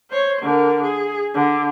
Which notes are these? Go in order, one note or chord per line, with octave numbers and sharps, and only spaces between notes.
C5 C#5
D3 A#4
G#4
D3